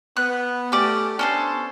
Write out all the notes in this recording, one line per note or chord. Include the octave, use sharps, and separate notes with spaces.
B3 F#6
A3 C#4 G4 D5
B3 C#4 D4 A4 C5